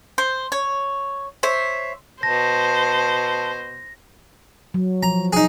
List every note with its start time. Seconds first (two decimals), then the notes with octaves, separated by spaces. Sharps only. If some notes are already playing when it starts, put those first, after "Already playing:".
0.18 C5
0.52 C#5
1.43 C5 C#5 E5
2.23 B2 C5 A5 A#6
4.74 F#3
5.03 F3 A#5
5.33 D#4 G#4